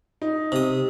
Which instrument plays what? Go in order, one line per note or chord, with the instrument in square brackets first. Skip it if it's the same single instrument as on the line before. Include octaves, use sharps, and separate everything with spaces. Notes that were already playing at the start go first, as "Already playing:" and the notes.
[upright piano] D#4
[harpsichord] C3 D#6